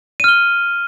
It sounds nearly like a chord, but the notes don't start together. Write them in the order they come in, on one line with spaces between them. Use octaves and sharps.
D#7 F6 G7